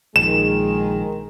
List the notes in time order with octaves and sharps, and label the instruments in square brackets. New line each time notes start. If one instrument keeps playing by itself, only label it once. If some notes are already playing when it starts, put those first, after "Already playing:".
[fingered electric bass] A#1 [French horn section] D#3 G#3 G#4 [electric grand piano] E7